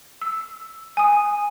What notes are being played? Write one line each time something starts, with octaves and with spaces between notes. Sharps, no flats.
E6
G#5 D#6